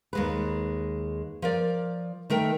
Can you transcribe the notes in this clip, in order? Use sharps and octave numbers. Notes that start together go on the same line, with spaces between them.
D#2 G#3 B4
F3 A#4 D5
D#3 A3 A#4 G5